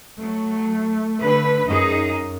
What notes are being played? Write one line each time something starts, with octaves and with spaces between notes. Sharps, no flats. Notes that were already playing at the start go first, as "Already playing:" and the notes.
F#3 A3
D3 B4
F#2 D#4 G#4